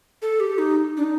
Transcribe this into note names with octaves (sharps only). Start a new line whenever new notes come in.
A4
G4
D#4
D4
D#4